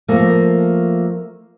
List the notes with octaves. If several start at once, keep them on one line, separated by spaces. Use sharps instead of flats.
F3 A3 A#3